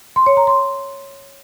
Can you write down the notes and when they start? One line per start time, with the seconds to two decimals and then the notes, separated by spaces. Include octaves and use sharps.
0.16 C6
0.26 C#5
0.37 A#5
0.47 C6